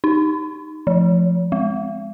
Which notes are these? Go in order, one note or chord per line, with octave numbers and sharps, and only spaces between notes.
D#4
F3
G#3